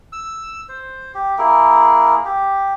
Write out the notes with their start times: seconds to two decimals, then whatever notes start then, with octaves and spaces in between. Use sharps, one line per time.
0.13 E6
0.69 C5
1.14 G4
1.38 A#3 E4 G#4 A#4
2.25 G4